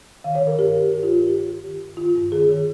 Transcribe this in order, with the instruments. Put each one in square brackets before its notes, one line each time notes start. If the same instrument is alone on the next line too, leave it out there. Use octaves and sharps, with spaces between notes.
[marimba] D#3 F5
C#5
D#3
A#4
G2 G4
D#3
G2 G4
F4
G2 G4
G2 G4
G2
D#3
G2
D#3 F4
G2
D#3 G#4
D#3